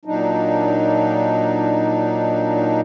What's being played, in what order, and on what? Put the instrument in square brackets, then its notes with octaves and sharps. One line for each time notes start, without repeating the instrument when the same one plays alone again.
[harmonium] A#2 F#3 D4 D#4